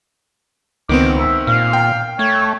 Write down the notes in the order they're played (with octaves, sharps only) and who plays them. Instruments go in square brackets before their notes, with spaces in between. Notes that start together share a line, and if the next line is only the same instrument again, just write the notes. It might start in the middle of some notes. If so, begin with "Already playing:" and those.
[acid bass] C#2 [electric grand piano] D#3 B3 C4 [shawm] D6
[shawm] E5
[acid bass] A#2 [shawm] F5
[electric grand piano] G5
[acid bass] A3 [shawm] C#5